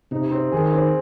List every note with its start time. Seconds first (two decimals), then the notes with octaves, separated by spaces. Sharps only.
0.11 C3 D#4
0.31 C4
0.52 D#3 G#4
0.74 C4